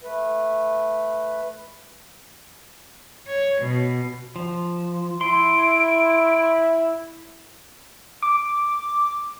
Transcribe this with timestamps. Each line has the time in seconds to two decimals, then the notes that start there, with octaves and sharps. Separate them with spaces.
0.03 A3 B4
3.27 C#5
3.61 B2
4.36 F3
5.21 E4 C6 D7
8.22 D6